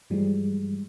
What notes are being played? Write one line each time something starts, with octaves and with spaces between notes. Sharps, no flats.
G2 E3 F3 G3 G#3